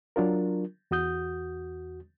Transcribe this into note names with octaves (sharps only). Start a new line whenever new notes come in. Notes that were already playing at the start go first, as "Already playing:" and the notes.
F#3 D4 F4 A#4
E2 F#4 D#6 G6